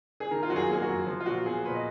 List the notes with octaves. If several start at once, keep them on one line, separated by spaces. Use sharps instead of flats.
G#4
D#3 A#4
F4
F#2 F#4
G#4
A#3 G#4
F#4
F#2
F3
F4
A#2 F#4
B3 G#4
A#2 B4
D#5